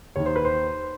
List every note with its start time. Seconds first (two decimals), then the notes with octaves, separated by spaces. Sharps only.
0.16 D#2 D#3 C#5
0.26 C5
0.36 B4
0.45 C5